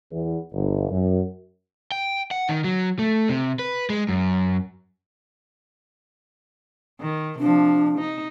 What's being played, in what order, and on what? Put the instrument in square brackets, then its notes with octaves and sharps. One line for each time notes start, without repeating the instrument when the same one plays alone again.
[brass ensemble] E2
G1
F#2
[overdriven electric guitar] G5
F#5
D#3
F#3
A3
C3
B4
G#3
F#2
[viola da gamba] D#3
[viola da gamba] C3 F3 [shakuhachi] D4
[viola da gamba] D#4